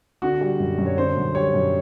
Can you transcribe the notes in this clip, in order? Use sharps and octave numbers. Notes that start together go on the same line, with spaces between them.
D3 F#4
G3
F#2
F#2
C#5
D3 C5
F#2
G3 C#5
F#2